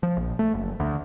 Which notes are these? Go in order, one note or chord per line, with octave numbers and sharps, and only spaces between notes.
F3
A#1
A3
F#1
D2